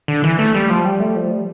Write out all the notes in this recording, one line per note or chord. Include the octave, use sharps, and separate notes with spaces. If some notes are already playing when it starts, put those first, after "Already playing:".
D3
E3
A3
G3
F3
G3
A3
F3
G3